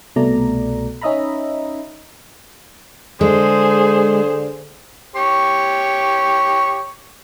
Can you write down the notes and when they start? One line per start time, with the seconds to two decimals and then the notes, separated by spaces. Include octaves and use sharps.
0.16 C2 B2 A3 D5 A#5
1.02 C#4 D#4 D#5 E5 A#5 B5
3.21 D3 G#3 G#4 C5
5.16 G4 C#5 C#6